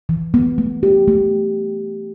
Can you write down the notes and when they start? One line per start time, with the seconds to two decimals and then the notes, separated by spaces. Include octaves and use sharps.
0.09 E3
0.34 B3
0.58 A3
0.83 G4
1.08 A3